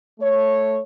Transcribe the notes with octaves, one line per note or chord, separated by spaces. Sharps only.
A3 C#5